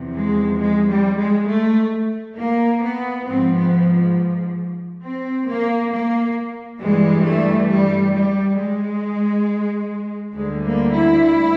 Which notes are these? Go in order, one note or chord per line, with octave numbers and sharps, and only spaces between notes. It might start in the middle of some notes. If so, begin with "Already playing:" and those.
Already playing: E2 C3 F3
G#3
G#3
G3
G#3
A3
A#3
B3
G#2 F3 C4
B3
C4
A#3
A#3
G2 E3 G3 G#3
A3
G3
G3
G#3
D2 D3 G3 G#3
A#3
E4